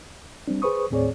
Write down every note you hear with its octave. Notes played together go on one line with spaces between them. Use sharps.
G3 C4 D4
G#4 B4 C5 C#6 D#6
D#2 A2 C4 G#4 C#5 D5